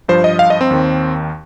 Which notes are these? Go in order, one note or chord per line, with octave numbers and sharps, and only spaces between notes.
G2 F3 C5
D#5
F5
D#5
C4
D#2 D#3